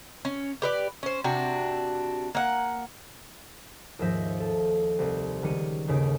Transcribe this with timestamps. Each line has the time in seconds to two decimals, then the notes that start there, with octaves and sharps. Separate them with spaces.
0.25 C#4
0.62 G4 B4 D5
1.03 C#4 C5
1.24 C3 D4 F#4
2.35 A#3 F#5
3.99 D#2 G#2 F3 E5 G6 A#6
4.40 A4
4.99 C2 C4
5.42 C#2 D#3 G3 C#7 D#7
5.88 G1 D#2 C#3 D7